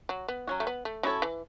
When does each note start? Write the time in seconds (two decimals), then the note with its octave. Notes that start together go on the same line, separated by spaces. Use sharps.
0.09 F#3
0.28 B3
0.47 F#3 C#4 F#4
0.60 A3
0.67 B3
0.85 A3
1.03 F#3 C#4 E4 A4 C#5
1.22 E3